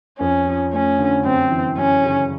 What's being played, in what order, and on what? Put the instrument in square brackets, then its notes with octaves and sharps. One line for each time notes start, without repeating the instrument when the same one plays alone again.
[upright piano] F2 [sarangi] C#4
[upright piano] F3
[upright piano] A3 [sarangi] C#4
[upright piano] D3
[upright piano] F#2 [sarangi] C4
[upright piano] E3
[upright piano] F#2 [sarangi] C#4
[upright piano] C#3